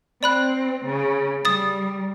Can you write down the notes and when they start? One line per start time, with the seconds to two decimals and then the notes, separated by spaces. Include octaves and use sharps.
0.23 C4 D5 B5 F#6
0.85 C#3
1.45 G3 D#6 A6